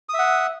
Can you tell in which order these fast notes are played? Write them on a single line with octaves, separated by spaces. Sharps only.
D#6 E5 F#5